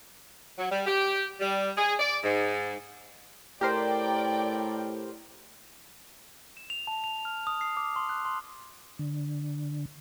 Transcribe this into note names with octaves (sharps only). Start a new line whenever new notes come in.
F#3
G3
G4
G3
G#4
D5
G#2
A2 G4 A#4 C5 D5 G5
E7
F7
A5
F7
F6
D#6
C7
D6
C6
F#6
C6
D3